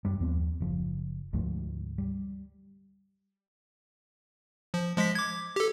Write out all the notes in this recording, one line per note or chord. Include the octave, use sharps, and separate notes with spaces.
F#2 G3
D#2 F3 B3 C4
F#1 F3
D2 G#2 F3 A3
G3
F3
F3 G#3 B6
D6 G#6
G4 A4